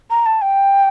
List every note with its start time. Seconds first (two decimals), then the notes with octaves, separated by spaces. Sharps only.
0.10 A#5
0.26 A5
0.42 G5